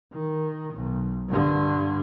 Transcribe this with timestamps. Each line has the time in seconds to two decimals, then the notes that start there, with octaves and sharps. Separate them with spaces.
0.13 D#3
0.74 B1
1.29 G2 D3